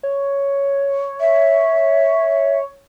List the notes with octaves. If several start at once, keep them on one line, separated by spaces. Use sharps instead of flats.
C#5
E5